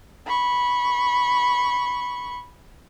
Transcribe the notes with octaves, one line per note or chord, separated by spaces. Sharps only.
B5 C#6